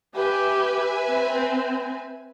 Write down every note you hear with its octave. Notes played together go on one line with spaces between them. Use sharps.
G4 B4 E5 G#5
C4